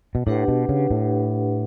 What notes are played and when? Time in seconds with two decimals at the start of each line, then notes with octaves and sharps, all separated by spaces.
0.15 B2
0.26 A2 D4 G4 B4 F#5
0.48 B2
0.69 C#3
0.91 A2